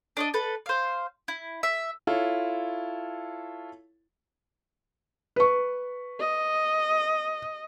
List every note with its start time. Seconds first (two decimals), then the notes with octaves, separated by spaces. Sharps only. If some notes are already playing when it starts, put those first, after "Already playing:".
0.17 D4 D5 D#5
0.34 A4 B4
0.66 C5 F5
1.28 E4
1.63 E5
2.07 E4 F4 A4 C#5
5.36 B4 C#6
6.20 D#5